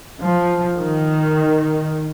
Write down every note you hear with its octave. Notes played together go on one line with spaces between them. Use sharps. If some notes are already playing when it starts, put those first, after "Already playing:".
F3
D#3